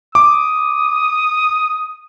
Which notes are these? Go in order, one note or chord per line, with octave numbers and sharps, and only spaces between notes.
D6 D#6